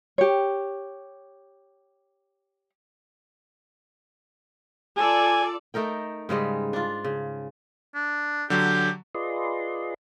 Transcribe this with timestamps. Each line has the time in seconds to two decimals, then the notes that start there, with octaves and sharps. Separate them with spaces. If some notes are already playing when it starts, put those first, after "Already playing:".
0.18 G4 C#5
4.97 F4 A4 D5 G#5
5.74 A3 D#4 A#4 G5
6.29 G#2 C#3 G3 G#3
6.73 D4 F4
7.04 C#3
7.95 D4
8.50 D3 F#3 G4
9.15 F4 G#4 B4 D5 D#5 C6